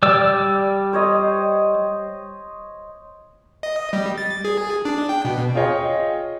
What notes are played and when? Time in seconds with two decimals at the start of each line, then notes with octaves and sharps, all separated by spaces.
0.03 G3 D5 E6
0.93 C5 C#5 D#5
3.63 D#5
3.93 G3
4.18 A6
4.45 G#4
4.85 D4
5.09 G5
5.25 B2
5.55 F4 G#4 C#5 D#5 G5